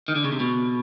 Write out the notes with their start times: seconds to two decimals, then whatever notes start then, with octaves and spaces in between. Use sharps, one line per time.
0.08 D#3
0.15 D3
0.24 C#3
0.32 C3
0.40 B2